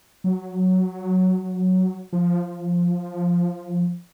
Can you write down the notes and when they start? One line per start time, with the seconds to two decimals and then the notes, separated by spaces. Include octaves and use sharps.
0.24 F#3
2.13 F3